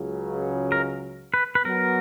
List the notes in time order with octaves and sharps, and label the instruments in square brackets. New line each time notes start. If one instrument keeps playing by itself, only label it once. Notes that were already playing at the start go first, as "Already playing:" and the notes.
Already playing: [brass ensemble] C#2 C#3 F#3
[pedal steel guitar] A#4
B4
B4
[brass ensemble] F#3 B3 F#4 [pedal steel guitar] A#4